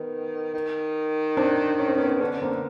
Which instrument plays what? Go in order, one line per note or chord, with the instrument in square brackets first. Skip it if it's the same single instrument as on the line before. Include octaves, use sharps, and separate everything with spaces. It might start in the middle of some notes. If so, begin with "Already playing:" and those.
Already playing: [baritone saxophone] D#3 [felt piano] B3
[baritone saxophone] D#3
[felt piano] C4 D4
C#4
C4
B3 C#4
[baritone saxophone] D3 [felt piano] B3 C#4
[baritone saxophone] D3 [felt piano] A#3 C4